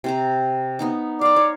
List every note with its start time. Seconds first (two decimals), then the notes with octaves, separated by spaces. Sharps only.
0.04 C3 C4 A#5
0.79 B3 D#4 A#5
1.21 D5 F5 A#5
1.36 C#5